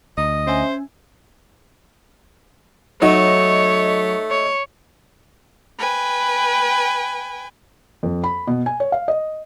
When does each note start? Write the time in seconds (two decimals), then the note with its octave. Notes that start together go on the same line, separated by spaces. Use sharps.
0.18 D2 D#5
0.47 C#4 C5 E5 G#5
3.02 F#3 A3 D#4 C#5
4.30 C#5
5.78 B4 G5 G#5
8.03 F2
8.24 B5
8.47 B2
8.66 G#5
8.80 C#5
8.92 F5
9.08 D#5